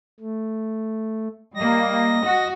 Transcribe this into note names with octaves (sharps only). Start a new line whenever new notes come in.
A3
G3 A#3 D#5 A#6
F#4